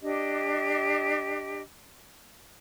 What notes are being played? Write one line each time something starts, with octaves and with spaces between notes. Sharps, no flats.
D4 G4 D#5